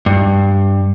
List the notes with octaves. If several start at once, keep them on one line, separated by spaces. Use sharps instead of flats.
G2